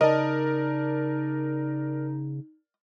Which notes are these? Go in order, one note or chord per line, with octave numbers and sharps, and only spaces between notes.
C#3 D#4 A#4 D5 D#5 A5